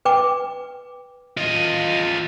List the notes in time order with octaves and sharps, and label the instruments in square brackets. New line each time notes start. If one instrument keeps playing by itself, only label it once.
[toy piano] B4 G5 D6
[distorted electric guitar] F4 D#5